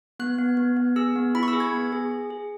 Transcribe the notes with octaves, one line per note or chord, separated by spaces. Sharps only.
B3 F#6
B3
B3
B3
G#4 E6
B3
E4 B5
C#6
E6
G#4
G#6
B3
G#4
G#4
G#4